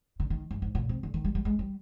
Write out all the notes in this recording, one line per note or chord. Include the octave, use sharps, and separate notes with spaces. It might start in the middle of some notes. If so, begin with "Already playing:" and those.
D3
D#3
G2
G#2
A#2
C3
D3
D#3
G3
G3
G#3
G3